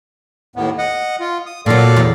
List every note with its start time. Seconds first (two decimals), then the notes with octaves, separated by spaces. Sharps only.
0.56 D#2 A2 B3
0.78 D#5 F#5
1.20 F4
1.46 D#6
1.66 A#2 F#3 A4 D5 F5
1.96 E2